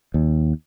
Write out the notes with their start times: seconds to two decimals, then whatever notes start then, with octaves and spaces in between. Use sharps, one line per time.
0.14 D#2